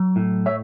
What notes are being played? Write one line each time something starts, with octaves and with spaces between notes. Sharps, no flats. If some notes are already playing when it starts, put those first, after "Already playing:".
Already playing: F#3
A2
C#5 E5